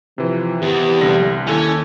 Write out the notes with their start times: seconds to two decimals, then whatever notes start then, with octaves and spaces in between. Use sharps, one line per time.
0.18 C3 E3 F3
0.62 E2 G4
1.01 C2 D3 A#6
1.47 D#2 C#4 E4 A4 G#5